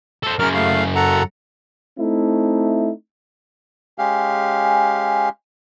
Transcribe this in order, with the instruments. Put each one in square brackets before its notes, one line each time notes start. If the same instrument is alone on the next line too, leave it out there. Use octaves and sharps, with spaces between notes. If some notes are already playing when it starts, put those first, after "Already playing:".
[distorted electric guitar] A4 C5
[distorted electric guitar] F#2 C#3 [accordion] A#4 F6
[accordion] A3 F5
A4 F#5 A#5
[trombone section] A3 C4 D#4 E4
[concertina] G#3 C#4 G4 F5